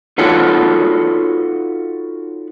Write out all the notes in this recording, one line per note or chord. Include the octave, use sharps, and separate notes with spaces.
D#4 F4 F#4 A4 B4 C#5